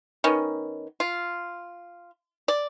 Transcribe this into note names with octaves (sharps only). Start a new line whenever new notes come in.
D#3 B3 C#4
F4
D5